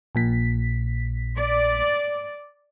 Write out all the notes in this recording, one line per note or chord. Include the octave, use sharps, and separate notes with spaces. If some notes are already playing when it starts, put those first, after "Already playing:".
A#1 A#2 B6
D5